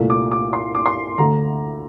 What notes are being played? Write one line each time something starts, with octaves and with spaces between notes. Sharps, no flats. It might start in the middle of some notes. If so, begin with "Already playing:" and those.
Already playing: C2 A#2 A3
D6
D6
C6
D6
C6
D2 D3 A3 A#5